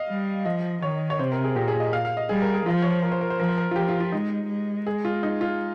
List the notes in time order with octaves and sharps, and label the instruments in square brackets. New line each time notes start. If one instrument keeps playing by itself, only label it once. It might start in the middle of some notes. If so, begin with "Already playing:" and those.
Already playing: [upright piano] D#5 F5
[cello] G3
[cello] F3 [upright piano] D#5
[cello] D#3 [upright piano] C#5
[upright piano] C#5
[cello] C3 [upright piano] C5
[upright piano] A#4
G#4
[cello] A#2 [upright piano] G4
[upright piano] G#4
D#5
F5
F5
D#5
[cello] G3 [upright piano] G#4
[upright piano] A#4
G#4
[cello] F3 [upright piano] F4
[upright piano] C#5
C5
A#4
C5
A#4
C5
[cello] F3 [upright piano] A#4
[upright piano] C5
A#4
F4
[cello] F3 [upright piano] G4
[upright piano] F4
F4
[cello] G#3 [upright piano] D#4
[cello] G#3
[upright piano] G#4
F4
D#4
F4